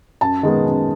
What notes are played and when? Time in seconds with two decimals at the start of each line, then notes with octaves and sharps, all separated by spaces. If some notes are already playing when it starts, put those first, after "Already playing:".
0.21 F#2 A5
0.43 D#3 G#3 B3
0.64 F#2